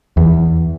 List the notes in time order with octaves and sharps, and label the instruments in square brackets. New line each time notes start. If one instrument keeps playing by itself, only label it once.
[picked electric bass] E2